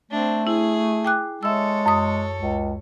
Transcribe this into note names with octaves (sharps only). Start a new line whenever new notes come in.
A3 C4 D4
E4 G#4
G5 D6 F#6
G#3 A4 C#5 E5 E6
F#2 D#6
C#2